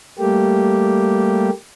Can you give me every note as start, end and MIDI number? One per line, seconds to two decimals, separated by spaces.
0.19 1.50 55
0.19 1.50 57
0.19 1.50 58
0.19 1.50 67